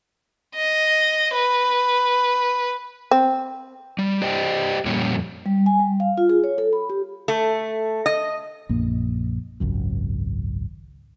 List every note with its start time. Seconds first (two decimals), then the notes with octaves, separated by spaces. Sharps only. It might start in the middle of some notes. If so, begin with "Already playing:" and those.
0.55 D#5
1.34 B4
3.11 C4
3.99 G3
4.22 G4 C5 D5 D#5 G5
4.85 F2 A#2 G3 A#3 C#4
5.46 G3
5.66 G#5
5.80 G3
6.00 F5
6.18 F4
6.30 G#4
6.44 C#5
6.58 A4
6.73 B5
6.90 G4
7.28 A3
8.06 D#5
8.69 A#1 F#2 A#3
9.60 G#1 C#2 F#2